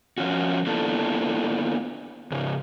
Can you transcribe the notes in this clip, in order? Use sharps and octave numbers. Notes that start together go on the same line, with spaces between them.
F3 C#4 F4 F#4
A#3 B3 D4 E4 F4 A4
G#2 C#3